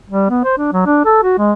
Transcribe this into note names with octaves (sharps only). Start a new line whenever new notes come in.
G3
B3
C5
D4
F#3
D4
A4
F#4
G#3